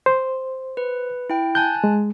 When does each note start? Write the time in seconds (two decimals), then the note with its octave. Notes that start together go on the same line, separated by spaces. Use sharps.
0.06 C5
0.77 B4
1.30 E4 G5
1.55 G#5 A5 F#6 G6
1.84 G#3